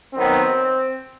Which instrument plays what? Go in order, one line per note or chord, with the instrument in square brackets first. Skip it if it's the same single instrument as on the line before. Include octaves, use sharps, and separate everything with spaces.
[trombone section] D#3 F#3 B3 C4